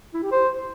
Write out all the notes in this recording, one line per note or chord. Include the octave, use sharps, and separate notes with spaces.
E4
G4
C5